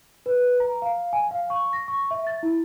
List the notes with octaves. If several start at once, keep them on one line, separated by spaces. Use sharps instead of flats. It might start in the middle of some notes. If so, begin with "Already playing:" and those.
B4
A#5
F5
G#5
F5
C#6
A#6
C#6
E5
A6
E4